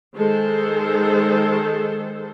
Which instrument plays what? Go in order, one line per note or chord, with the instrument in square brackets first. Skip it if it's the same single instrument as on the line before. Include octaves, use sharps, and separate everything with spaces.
[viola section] D#3 G#3 G#4 A4 C5